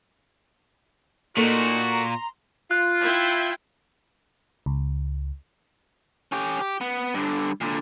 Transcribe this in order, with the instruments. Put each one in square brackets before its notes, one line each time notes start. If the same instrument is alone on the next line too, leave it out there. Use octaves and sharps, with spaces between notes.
[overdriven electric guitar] A#2 [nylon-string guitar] A#3 A4 [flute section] D#4 C#6 [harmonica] F#4
[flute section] A#5 C6
[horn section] F4 [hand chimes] F#6
[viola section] E4 E5 G5
[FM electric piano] C#2
[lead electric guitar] C#4 G4
G4
B3
G2 D3
A#2 D3